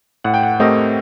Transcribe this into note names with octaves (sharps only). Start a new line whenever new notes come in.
A2 F#5
G5
F#5
A3 C4 G4 A#4 D#5